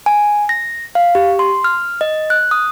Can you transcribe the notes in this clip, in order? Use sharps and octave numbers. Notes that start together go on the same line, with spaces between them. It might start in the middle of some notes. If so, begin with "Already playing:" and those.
G#5
A#6
F5
G4
C6
F6
D#5
F#6
D#6